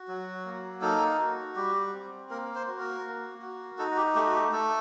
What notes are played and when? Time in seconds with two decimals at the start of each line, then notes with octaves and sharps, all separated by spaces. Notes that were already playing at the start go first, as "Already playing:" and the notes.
Already playing: F#4
0.08 F#3
0.45 A#3
0.82 D#4 A4
1.19 F#4
1.56 G3 G4
1.93 C4
2.30 A#3 A#4
2.55 C5
2.68 F#4
2.79 A#4
3.04 A#3
3.42 F#4
3.78 D#4 A4
3.91 F#4
3.97 G4
4.15 A3 G4
4.27 F#4
4.34 G4
4.52 A3 A4